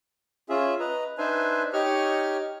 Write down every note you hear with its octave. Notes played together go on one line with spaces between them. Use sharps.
C#4 F4 G#4 E5
B4 D#5 A#5
D4 D#4 B4 C5 E5 G#5
D#4 G4 C#5 D#5 C#6 F6